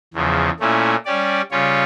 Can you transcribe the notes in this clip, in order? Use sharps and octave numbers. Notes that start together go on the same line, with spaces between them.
E2 C#3 F3
A#2 A3 C#4 E4
G3 C#4 G4 D5
C#3 G3 C#4 F4 C#5